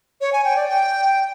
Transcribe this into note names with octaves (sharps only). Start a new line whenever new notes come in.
C#5
G#5
G5
D5
G5